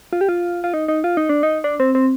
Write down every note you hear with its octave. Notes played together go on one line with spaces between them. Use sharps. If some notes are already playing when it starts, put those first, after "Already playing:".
F4
G4
F4
F4
D#4
D#4
F4
D#4
D4
D#4
D4
C4
C4